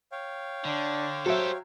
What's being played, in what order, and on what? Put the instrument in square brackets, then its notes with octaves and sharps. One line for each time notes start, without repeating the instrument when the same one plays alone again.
[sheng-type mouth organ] C#5 F5 G5
[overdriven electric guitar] D3 [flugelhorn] D4
[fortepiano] F#3 E5 [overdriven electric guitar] G4 A4 [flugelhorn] C5